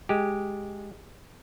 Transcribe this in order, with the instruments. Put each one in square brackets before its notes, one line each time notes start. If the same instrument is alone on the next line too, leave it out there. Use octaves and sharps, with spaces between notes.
[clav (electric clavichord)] G#3 G4